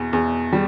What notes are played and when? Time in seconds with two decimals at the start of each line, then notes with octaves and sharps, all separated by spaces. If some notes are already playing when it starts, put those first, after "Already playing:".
Already playing: E2 B2
0.13 E2
0.53 G3